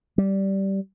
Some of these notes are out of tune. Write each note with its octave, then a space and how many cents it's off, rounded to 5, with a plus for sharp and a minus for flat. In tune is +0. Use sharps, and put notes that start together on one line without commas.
G3 -10